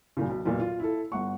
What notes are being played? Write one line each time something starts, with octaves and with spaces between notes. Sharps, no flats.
F#2 A#2 C#3
B1
B1 E2 A#2
F4
E4 A4
G1 F#5 C#6